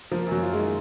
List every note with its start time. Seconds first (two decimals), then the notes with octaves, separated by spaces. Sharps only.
0.11 F3 A#3
0.27 F#2 F#3
0.42 F4
0.53 G#3
0.58 D#3